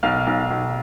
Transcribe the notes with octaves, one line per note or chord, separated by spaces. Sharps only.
B1 F5 F6
B1
B1